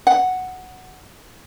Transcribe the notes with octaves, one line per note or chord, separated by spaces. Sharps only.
F#5